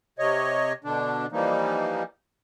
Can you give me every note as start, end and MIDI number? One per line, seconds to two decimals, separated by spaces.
0.19 0.73 48
0.19 0.73 73
0.19 0.73 75
0.84 1.26 47
0.84 1.26 50
0.84 1.26 62
1.32 2.03 52
1.32 2.03 53
1.32 2.03 55
1.32 2.03 58
1.32 2.03 63